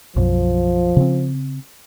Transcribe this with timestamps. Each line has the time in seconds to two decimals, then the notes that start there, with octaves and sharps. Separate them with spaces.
0.16 B1 F#2 F3
0.97 C#3 C4